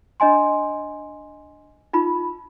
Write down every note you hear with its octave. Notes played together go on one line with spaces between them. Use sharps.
D4 D#5 G#5 C6
D#4 F4 B5